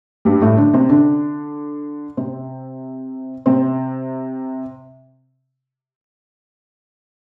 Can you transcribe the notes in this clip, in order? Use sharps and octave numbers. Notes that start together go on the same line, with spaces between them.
G2 G3
A2 A3
D3 D4
C3 C4
D3 D4
C3 C4
C3 C4